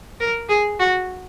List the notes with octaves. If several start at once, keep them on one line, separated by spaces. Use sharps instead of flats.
A#4
G#4
F#4